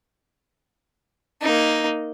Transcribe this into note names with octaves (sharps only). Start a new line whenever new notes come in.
A#3 D#4